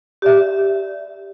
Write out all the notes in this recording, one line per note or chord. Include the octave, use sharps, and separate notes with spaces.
G4 D5 E5